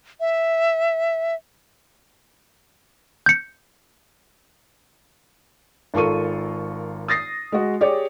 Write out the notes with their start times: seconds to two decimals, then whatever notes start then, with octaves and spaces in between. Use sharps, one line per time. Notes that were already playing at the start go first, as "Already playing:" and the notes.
0.20 E5
3.26 G6 C#7
5.94 G#1 F4 A4 A#4 C#6 D#7
7.08 D#6 A6 A#6 C7
7.52 G#3 F#4
7.81 G4 G#4 C#5 D5